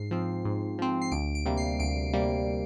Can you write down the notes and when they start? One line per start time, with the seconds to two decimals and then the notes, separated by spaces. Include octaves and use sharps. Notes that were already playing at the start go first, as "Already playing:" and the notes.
Already playing: G#2 C7
0.11 F3 C4
0.45 G#2
0.79 F3 C4
1.02 C7
1.12 D2 D7
1.35 D7
1.46 C3 G3 A#3
1.57 C7
1.79 D2 D7
2.13 C3 G3 A#3